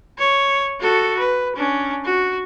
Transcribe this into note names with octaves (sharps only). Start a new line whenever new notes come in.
C#5
F#4 A4
B4
C#4 D4
F#4